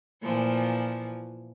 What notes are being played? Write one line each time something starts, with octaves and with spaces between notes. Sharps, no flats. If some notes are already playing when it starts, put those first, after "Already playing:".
A#2 E3 F3